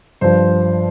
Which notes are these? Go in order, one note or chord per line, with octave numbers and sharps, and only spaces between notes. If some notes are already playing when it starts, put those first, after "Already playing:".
G2 F3 C5